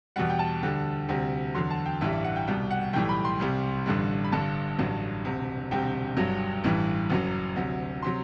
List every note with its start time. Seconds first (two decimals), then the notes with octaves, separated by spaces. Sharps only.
0.16 E2 B2 G3 F#5
0.30 G5
0.39 A5
0.62 D2 D3 G3
1.08 D2 C3 G3
1.55 E2 D3 F#3 C6
1.70 A5
1.86 G5
2.01 A1 G2 E3 G3 E5
2.13 E5
2.24 F#5
2.36 G5
2.47 C2 B2 G3 G5
2.71 F#5
2.93 B1 A2 E3 G3 G5
3.09 B5
3.25 C6
3.40 C2 C3 G3
3.86 A1 G2 D3 G3
4.24 B5
4.32 G1 G2 D3 A5
4.78 A1 G2 F#3
5.25 E1 D2 C3
5.71 E1 D2 C3 G3 G5
6.17 G1 G2 F#3
6.64 A1 G2 E3 G3
7.10 F#1 F#2 F#3
7.56 D2 C3 F#3
8.02 C3 F#3 C6